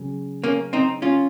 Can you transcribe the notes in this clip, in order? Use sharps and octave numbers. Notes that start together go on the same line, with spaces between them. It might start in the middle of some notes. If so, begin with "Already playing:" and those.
Already playing: C#3 F#3
A#3 C#4
C4 D#4
C#4 F4